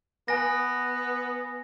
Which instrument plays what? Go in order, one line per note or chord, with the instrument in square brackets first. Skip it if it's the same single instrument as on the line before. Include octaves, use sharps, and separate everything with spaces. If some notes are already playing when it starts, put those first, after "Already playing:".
[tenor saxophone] B3 [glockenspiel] G#5 A#6